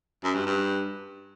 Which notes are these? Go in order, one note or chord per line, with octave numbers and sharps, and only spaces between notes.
F#2
G2
G2